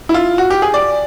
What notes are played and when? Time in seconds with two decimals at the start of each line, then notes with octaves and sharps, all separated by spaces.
0.09 E4
0.14 F4
0.38 F#4
0.50 G4
0.62 G#4
0.74 D5